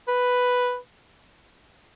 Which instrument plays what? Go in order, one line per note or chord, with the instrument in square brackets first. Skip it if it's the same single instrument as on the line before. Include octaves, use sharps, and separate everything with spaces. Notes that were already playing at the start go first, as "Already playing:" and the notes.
[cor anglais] B4